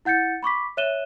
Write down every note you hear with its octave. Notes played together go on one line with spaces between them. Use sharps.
E4 F#5 G6 A6 C#7
B5 C#6 D6 B6
C#5 E5 F#6 D#7 E7 G7